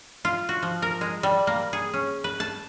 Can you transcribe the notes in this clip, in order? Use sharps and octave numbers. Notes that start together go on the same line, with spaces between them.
F4
F#4
F3
A#4
G#3
G3
A#3
G#4
C#4
B4
A5